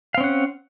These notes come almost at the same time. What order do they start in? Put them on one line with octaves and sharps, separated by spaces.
F5 C4 C#4 F#5